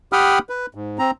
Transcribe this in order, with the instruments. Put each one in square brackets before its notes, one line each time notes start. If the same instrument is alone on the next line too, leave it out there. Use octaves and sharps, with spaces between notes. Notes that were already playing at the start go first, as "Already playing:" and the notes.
[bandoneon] G4 F#5 G5 B5 D#6 F6
B4
G#2
C4 A#5